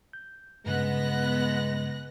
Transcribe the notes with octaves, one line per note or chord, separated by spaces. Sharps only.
G6
G2 C#3 G#3 B3 F#6 A#6